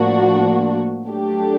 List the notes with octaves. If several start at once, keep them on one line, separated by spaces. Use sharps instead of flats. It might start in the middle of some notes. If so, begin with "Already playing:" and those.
Already playing: A2 F3 A#3 D4 F#4
F#3 A3 D4 G4